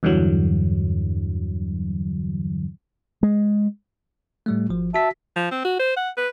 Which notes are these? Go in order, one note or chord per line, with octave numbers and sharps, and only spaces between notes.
E2 G2 D3 E3 F#3
G#3
A2 G3 A3
G#1 F3
F#4 E5 A5 B6
F3
C4
F#4
C5
F#5
B4